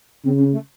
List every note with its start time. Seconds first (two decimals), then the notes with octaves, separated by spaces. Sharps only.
0.24 C#3 C4
0.38 C#4
0.52 A3